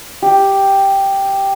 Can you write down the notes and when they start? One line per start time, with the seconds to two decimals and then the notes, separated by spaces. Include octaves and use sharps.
0.22 G4